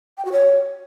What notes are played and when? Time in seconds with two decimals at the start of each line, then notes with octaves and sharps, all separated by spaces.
0.18 G5
0.25 F#4
0.32 C#5